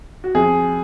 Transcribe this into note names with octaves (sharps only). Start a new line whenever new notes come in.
F#4
F2 G#4